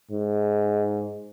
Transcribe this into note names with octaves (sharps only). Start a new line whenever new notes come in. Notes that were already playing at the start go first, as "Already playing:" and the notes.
G#2